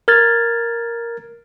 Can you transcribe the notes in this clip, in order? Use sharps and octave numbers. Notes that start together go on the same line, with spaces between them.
A#4 F6 G#6 A6